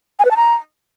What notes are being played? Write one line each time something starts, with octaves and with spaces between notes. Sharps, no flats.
G#5
B4
A5
A#5